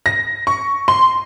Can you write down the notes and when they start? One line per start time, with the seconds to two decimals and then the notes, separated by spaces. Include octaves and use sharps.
0.06 A#6
0.47 C#6
0.88 C6